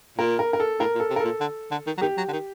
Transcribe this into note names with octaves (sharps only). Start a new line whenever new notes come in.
A#2 A#4
A#4
A#4
A4
A2 A#4
A#2
A4
C3
A#4
A4
A#2
D3
D3
D#3
F#3
D#3 G4
F#3
D3
D#3